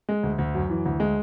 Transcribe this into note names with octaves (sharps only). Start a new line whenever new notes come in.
G#3
D2
D2
F#2
E3
D2
G#3